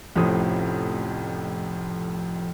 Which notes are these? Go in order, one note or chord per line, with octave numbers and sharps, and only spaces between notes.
F1 F2 A2 F3 C#4 D#6